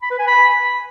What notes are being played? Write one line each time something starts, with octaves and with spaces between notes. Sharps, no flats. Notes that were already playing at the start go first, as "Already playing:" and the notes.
B5
B4
G#5
B5